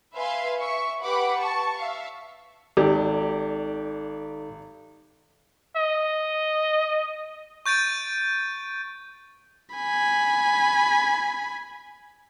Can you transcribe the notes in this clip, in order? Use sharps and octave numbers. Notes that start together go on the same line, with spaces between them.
B4 E5 F5 G#5 C6
E5 C#6
G4 B4 F#5 B5 D6
A5 C#6
E5 F5
G#1 D#4 G4 A4 D5
D#5
C#6 G6 A6 D7 D#7
G#5 B5